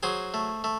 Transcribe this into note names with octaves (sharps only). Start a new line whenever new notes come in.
F#3 G#4 C5
A3
A3